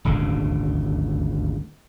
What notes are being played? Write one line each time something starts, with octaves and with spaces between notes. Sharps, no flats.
D#1 G#1 D2 C#3